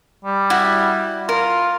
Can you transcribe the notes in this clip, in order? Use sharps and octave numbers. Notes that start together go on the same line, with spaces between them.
G3
E4 F#4
F4 A#4